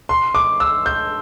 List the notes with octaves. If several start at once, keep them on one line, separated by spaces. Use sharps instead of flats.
C6
D6
E6
G6